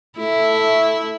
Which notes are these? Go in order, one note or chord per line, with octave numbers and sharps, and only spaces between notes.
A3 E4